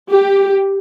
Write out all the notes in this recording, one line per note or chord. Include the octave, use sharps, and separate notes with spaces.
G4